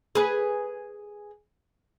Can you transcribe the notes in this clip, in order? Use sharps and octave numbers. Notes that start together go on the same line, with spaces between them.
G#4 B4